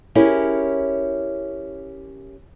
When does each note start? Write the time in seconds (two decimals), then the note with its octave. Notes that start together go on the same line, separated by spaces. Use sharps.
0.15 C#4 E4 G4 G#4 A#4 C#5